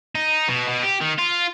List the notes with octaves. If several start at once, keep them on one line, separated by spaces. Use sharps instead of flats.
D#4
B2
B2
G4
D#3
F4